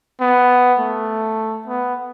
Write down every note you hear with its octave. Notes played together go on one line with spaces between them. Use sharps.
B3
A3
B3